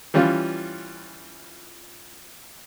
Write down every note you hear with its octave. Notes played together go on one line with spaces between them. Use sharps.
E3 G3 C#4 F4